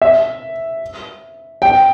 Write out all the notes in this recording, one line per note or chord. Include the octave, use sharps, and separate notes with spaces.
E5
G5